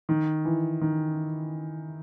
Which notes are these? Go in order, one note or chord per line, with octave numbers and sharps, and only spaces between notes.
D#3
E3
D#3